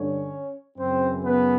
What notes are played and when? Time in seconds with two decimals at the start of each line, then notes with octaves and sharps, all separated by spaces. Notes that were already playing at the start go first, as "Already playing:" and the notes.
Already playing: G2 D3 C#4 C#5
0.78 F#2 C#3 E3 C4 C5
1.23 B3 B4